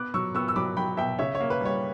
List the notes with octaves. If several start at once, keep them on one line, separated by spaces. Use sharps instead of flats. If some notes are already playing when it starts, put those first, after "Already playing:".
Already playing: B3 D6 F#6
F#3 C#6 E6
B3 C#6 E6
E6
F#3 B5 D6
F#3 G5 B5
B2 E5 G5
C#3 C#5 E5
C#5
A#3
B4
G3 C#5